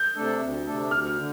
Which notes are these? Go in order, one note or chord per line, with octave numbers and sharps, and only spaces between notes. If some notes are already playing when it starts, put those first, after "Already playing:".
Already playing: G6
C3 A3 D4 A4
D2
C3 A3 D4 A4
D2 F6
D3